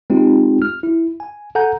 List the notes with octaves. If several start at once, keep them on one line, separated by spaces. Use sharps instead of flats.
G#3 C4 D#4 F4 G4
F6
E4
G#5
A4 F#5 G#5 A#5 G6